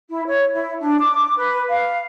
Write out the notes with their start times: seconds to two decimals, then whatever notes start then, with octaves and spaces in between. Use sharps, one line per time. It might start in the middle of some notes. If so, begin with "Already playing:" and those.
0.10 E4
0.27 C#5
0.53 E4
0.81 D4
1.00 D6
1.36 B4
1.70 F5